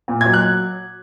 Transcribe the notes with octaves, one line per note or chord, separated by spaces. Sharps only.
A#2
F#3 G#6
F#6